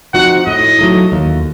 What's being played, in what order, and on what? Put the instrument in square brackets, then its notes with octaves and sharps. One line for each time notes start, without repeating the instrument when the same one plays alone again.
[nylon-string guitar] F3 C4 D#4 F#4 [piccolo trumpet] F#5
[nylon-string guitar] A2 [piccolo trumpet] D#5
[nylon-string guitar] F#3 A3 D#4
D#2